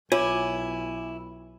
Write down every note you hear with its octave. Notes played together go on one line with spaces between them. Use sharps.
B1 E4 F4 C#5 G#5 D6